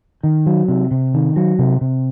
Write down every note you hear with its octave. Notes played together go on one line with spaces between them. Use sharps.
D#3
F#3
C3
C3
D#3
F#3
C3
C3